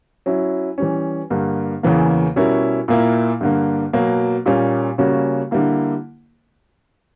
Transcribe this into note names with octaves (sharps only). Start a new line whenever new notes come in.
F#3 C#4 E4
E3 G3 C#4
G2 D3 A#3
E2 C#3 E3 A#3
B2 G3 C#4 E4 A#4
A#2 A#3 E4
G2 D3 A#3
B2 F#3 A#3
A#2 G3 A#3 C#4
C#3 G3 A#3 C#4 F#4
D3 G3 A#3 E4